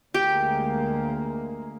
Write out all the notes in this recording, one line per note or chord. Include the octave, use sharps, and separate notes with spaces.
D2 G#3 A#3 G4